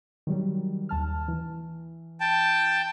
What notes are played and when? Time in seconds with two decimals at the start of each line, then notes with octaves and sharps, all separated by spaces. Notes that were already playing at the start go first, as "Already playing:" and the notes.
0.27 D#3 F#3 G3
0.89 D#2 A5 F6
1.28 E3
2.20 G5 A5